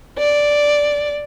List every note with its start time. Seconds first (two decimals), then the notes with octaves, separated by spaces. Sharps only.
0.19 D5